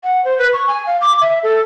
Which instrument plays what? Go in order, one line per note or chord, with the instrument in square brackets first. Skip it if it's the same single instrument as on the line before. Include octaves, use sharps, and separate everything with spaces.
[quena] F#5
C5
B4
C#6
G#5
F5
D6
E5
A4